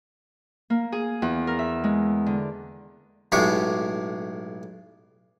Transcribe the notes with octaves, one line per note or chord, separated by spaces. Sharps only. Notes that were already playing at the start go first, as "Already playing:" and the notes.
A#3
G#4
E2
A#4
E5
G#3
D3
B1 A2 G#3 G4 C#6